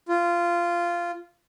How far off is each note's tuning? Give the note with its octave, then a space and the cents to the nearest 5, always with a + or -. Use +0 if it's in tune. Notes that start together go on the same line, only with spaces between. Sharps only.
F4 -15